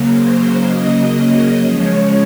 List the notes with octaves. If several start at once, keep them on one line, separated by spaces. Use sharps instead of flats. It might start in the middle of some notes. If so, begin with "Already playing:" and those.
Already playing: C#3 F#3 A#3
C5
D#5
D#5
C#3 F3 G#3 C#5